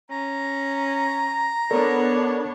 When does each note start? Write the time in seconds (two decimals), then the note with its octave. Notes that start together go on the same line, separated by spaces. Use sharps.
0.11 C#4 A#5
1.71 B3 D4 A4 A#4 C#5 D5